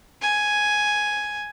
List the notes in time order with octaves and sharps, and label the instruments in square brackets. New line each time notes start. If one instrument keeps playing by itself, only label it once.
[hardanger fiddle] G#5